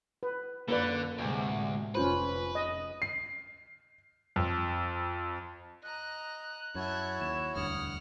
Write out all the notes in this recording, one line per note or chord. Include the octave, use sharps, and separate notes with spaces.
B4
F#2 D3 A#3 B4 D5
D2 A2 C3 G#3
F1 C#4 F4 B4 C5
D#5
C7
F2
D#5 A#5 F#6
F#2 E4 F#4 C#5 E5 A5
D#2 E7
E1 D2 G2 F#5 D#6 F6